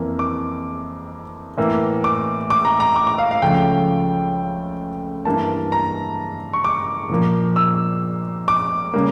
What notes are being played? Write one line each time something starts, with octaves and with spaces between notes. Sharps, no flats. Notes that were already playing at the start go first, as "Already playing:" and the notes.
Already playing: F2 E3 A#3
D6
A2 E3 A#3
D6
D6
A#5
A#5
D6
D6
F5
F5
C#2 C#3 F3 A3 G5
G2 E3 A#3 A5
A#5
C#6
D6
A#2 F3 A#3
E6
D6
C#3 G3 A#3